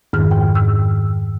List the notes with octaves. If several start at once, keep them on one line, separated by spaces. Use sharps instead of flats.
F2 G#2 D#3 F6
G5
E6